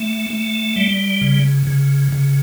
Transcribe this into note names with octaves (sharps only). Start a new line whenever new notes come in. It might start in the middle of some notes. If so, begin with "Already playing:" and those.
Already playing: A3
A3
G3
C#3
C#3
C#3